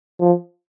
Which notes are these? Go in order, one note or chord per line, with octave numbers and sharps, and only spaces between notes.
F3